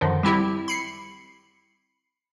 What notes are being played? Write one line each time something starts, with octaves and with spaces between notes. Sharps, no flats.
F#2 D3 D#3 F3
G3 C4 E4 G4
B5 C7 C#7